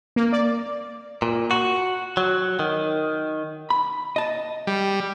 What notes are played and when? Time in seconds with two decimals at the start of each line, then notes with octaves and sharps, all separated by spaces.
0.16 A#3
0.32 D5
1.22 A#2
1.51 F#4
2.17 F#3
2.59 D#3
3.70 B5
4.16 D#5 A5
4.67 G3